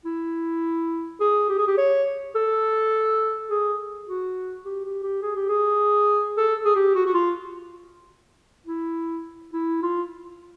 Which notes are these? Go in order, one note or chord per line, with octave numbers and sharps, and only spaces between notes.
E4
G#4
G4
G#4
G4
C#5
A4
G#4
F#4
G4
G4
G4
G#4
G4
G#4
A4
G#4
G4
F#4
F#4
F4
E4
E4
F4